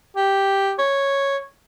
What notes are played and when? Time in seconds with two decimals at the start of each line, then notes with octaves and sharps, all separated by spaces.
0.17 G4
0.79 C#5